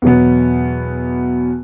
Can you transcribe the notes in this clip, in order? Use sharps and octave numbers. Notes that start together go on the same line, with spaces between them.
E2 B2 F#3 B3